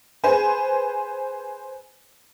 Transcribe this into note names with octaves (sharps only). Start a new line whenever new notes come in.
G#4 B4 C5 G#5